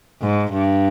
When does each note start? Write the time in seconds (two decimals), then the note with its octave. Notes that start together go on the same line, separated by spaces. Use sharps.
0.21 G#2
0.53 G2